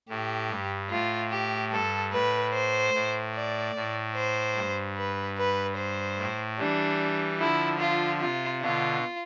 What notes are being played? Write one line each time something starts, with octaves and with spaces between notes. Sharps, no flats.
A2 G4
G2
A2 F4
G4
G2 A4
A2 B4
C5
A2
D5
A2
C5
G2
B4
B4
C5
A2
E3 G3 D4
D3 F3 E4
F4
C3 F4
B2 D3 F4